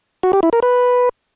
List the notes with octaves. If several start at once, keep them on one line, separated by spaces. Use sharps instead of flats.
F#4
G4
E4
A#4
B4